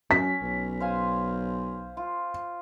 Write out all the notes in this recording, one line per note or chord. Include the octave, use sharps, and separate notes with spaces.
F#2 C#4 B6
B1
C5 F5 G#5
F4